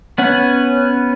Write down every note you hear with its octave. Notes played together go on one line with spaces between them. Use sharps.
B3 C#4 F#5